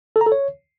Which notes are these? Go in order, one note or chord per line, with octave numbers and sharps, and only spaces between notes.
A4
A#5
A4
C#5